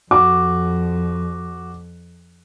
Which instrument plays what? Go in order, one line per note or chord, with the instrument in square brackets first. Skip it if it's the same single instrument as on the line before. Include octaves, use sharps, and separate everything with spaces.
[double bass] F2 [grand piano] F#4 [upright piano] D6